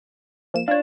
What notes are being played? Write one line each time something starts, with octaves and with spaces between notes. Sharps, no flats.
F3 A#3 E7
D4 F4 C#5